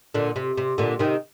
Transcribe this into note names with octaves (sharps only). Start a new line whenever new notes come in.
A#2 D3
C3
C3
A#2 D3
C3 D#3